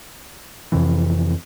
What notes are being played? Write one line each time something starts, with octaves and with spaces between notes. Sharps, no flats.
F2 C3 E3